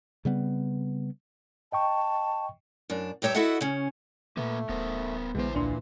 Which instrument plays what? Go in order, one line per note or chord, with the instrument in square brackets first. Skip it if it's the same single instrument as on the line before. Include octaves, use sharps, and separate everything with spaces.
[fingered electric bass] C#3 G3 B3 C4
[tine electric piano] D#5 G5 C#6 [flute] A5
[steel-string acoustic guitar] F#2 D4
G2 G4 C#5 E5 A#5
E4 F#4 A4 D#5 E5 F#5
C#3 C#4
[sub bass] A#2 [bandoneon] A3 [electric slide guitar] A#3 B4
[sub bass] D1 [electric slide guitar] B3 A#4 C5
[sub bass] A#1 [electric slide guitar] D3 C5 [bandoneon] E3 [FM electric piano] G#3 B3
[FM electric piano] D2 D4 C6 [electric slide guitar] A#2